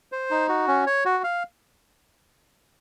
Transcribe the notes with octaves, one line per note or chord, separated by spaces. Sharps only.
C5
D#4
F#4
C#4
C#5
F#4
F5